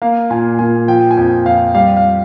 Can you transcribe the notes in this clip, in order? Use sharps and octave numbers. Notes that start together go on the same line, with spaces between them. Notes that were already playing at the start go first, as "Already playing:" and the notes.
A#3 F5
A#2 G#5
A#2 G#5
F3 G5
G#5
F2 G5
F2 F5
G3 F5
F5